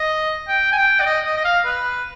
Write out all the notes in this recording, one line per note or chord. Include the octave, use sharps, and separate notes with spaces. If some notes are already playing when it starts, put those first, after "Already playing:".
Already playing: D#5
G5
G#5
G5
D5
D#5
D#5
D#5
F5
B4